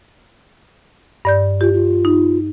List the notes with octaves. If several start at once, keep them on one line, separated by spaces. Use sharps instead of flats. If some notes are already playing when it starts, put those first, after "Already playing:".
G2 D5 G6
F4 G4
F4
D#4